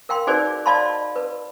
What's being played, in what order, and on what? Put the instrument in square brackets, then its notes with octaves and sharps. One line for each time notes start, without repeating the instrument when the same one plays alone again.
[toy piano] A#4 F5 G5 C6
D#4 F#4 G#4 B4 C5 D5
D5 D#5 F5 A5 B5 C6
B4